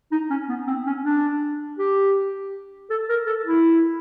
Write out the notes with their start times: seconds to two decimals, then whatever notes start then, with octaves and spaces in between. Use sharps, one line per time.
0.12 D#4
0.30 C#4
0.49 B3
0.67 C4
0.87 C#4
1.04 D4
1.79 G4
2.90 A4
3.09 A#4
3.27 A4
3.45 E4